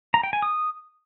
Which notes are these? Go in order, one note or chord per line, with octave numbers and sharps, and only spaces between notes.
A#5
G5
G#5
D#6